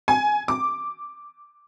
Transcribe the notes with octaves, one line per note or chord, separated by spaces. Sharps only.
G#5
D6